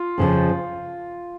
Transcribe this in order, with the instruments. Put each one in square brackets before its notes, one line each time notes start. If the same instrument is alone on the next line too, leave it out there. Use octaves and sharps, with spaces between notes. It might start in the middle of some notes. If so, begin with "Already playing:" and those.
Already playing: [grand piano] F4
[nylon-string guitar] F2 C#3 F3